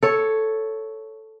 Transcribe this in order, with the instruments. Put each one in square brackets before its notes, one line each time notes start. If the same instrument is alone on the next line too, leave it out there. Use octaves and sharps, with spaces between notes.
[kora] A4 C#5